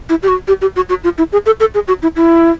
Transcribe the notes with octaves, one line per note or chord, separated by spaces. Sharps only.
E4
G4
F#4
G4
G4
F#4
F#4
F4
E4
G#4
A4
A4
G#4
F#4
E4
E4